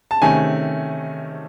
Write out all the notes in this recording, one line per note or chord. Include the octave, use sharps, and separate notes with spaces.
A5
C3 D#3 A3 C#4 G#5